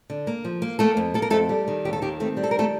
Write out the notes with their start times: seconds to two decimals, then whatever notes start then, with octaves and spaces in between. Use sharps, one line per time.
0.10 D3
0.27 A#3
0.45 F3
0.62 A#3
0.79 A3 A#3 A4
0.97 F2
1.14 A#3 A4
1.22 A#4
1.30 F2 A3 A4
1.49 G3
1.68 D#3
1.85 D#2 G4
1.93 A4
2.02 D#3 G4
2.20 A3 C4 A4
2.37 G3
2.44 A4
2.51 A#4
2.54 D#3 A3 A4